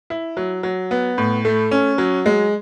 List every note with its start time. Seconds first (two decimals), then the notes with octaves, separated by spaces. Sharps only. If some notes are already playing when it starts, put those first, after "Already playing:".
0.10 E4
0.37 F#3
0.63 F#3
0.91 B3
1.18 A2
1.45 A3
1.71 C#4
1.98 F#3
2.26 G#3